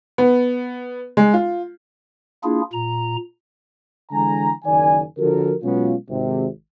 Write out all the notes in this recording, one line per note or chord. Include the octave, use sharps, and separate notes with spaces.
B3
G#3
F4
A#3 D4 E4 F4 G#4
A#2 A#5
D3 E3 G#3 G#5 A#5
F#1 D#3 D5 G#5
D3 F3 F#4 A4 A#4
B2 F#3 G#3 B3 C#4 F4
G#1 C3